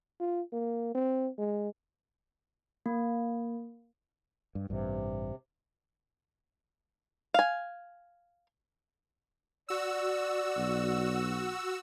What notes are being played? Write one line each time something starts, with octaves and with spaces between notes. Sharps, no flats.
F4
A#3
C4
G#3
A#3
G2
A1 G2 C3
F5 G#5
F#4 D5 E6
B1